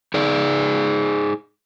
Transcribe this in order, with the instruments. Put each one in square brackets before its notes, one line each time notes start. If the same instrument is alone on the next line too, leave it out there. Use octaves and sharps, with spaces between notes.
[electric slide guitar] D#4 G#4 D5